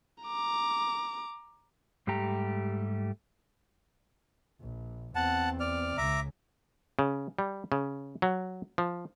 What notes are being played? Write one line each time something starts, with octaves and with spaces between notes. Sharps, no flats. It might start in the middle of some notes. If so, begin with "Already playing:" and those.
A#5 D6
G#2 G3 A3 G4 A#5
A#1
E2 C4 F#5 A5
D5 F6
C#2 C#3 E5 A#5 D6
C#3
G3
C#3
F#3
F3